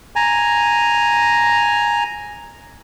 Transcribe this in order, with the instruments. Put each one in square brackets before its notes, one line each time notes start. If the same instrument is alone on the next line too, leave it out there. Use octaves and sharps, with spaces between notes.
[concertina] G#5 A#5